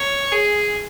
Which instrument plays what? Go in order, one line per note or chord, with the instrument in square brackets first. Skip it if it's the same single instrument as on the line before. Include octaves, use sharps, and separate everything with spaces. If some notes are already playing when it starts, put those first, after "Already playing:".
Already playing: [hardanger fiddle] C#5
G#4